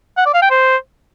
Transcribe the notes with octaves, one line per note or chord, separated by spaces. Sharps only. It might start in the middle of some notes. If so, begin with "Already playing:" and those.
F#5
D5
F5
G5
C5